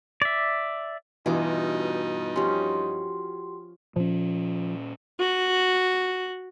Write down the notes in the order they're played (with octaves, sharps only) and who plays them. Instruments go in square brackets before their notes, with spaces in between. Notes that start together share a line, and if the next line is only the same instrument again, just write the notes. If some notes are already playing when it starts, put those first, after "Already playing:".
[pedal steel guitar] D5 E5
[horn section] G2 D#4 [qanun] B2 F4 D6 [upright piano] E3
[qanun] F3 C#4 [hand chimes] F#4 G4 C6
[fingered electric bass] A#2 C#4 [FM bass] F3
[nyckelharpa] F#4